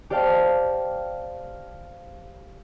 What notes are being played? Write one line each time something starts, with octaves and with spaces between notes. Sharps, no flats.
G4 C5 D5 F5 G5 A5